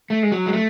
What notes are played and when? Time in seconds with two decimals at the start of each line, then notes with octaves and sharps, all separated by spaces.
0.10 A3
0.23 G#3
0.32 F#3
0.46 G#3
0.53 A3